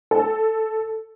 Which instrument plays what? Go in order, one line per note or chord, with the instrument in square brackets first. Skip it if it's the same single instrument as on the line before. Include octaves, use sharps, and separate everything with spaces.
[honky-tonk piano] A4